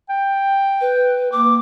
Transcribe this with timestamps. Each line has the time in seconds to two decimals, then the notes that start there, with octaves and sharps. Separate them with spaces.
0.09 G5
0.81 B4
1.32 A#3 D6